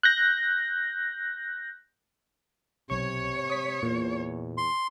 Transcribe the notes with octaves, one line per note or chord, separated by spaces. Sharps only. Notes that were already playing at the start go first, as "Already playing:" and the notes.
F#6 G6 A#6
B1 C3 C#5 C#6
C#6 D#6 B6
E2 A#2
C6